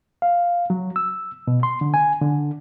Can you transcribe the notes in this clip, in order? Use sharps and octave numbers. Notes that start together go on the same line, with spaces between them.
F5
F#3
E6
B2
C6
D3
G#5
D3